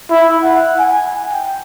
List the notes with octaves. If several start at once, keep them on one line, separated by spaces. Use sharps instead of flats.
E4
F#5
G#5
G5